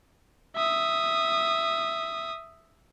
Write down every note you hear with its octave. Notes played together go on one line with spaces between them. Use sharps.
E5 D#6